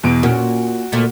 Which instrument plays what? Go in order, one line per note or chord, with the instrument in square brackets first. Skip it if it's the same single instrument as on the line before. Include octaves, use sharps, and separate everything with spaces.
[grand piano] E2 B2 D7
[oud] A#2 C#4 A#4 [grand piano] F#4
[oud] D2 A#2 A3